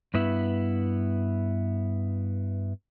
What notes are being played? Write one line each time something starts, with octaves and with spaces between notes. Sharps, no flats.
G2 B3 E4